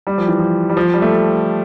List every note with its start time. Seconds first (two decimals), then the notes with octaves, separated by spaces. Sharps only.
0.07 G3
0.18 F3
0.28 E3
0.39 F3
0.70 G3
0.77 F3
0.94 G3
1.02 A3